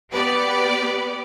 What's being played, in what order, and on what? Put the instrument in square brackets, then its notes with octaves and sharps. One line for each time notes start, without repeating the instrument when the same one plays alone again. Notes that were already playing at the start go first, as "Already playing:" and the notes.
[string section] B3 G4 B4 D5